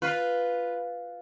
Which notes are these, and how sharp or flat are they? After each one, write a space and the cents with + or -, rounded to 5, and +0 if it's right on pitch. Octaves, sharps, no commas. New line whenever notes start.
F4 +0 B4 +0